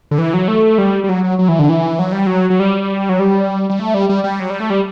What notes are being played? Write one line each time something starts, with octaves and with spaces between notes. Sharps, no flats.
D3
E3
F#3
A3
G3
G3
F#3
F#3
F#3
E3
D3
E3
F#3
G3
F#3
F#3
G3
F#3
G3
G3
A3
G3
G3
G3
F#3
G3
A3
G3